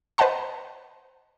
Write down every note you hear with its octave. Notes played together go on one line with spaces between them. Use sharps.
B4 C5 D#5 F#5 A5 C6